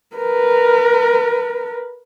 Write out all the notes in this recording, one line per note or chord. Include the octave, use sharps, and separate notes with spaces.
A#4 B4